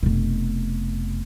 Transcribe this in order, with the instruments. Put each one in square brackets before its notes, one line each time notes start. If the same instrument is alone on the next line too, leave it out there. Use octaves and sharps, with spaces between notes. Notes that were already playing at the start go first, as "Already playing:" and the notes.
[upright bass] F1 B2